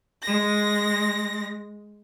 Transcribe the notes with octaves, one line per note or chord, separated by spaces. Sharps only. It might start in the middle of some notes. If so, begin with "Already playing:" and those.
G#3 A#6